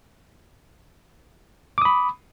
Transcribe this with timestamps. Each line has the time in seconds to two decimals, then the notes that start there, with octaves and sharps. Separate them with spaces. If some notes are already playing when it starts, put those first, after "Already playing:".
1.78 D6
1.82 D#6
1.85 B5